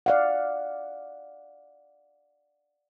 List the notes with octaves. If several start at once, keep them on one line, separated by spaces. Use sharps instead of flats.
D5 F5 F#5